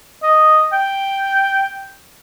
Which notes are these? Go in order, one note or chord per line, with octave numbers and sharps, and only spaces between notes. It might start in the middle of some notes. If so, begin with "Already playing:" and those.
D#5
G5